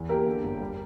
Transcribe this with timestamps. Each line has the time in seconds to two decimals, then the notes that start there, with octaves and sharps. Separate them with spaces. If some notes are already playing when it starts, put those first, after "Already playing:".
Already playing: E2 E3
0.09 A#3 G4 A#4
0.27 D3
0.44 G1
0.60 G3